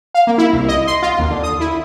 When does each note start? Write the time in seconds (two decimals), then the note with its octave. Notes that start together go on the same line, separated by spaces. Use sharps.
0.15 F5
0.27 A#3
0.38 E4
0.53 C2
0.68 D#5
0.87 C6
1.02 F4
1.19 D#2
1.31 D3
1.43 D#6
1.60 E4